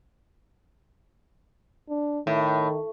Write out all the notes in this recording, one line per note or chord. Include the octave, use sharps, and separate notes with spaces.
D4
A2 D#3